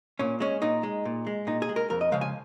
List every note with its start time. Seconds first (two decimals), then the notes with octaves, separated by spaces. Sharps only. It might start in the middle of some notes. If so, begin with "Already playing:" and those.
0.19 A#2 C#4
0.40 G#3 C#4
0.62 A#2 D#4
0.83 G#3
1.05 A#2
1.27 G#3
1.47 A#2 D#4
1.62 G#4
1.69 G#3
1.76 A#4
1.90 F2 A#4
2.01 D#5
2.12 C#3 F3 G#3 F5
2.21 G#5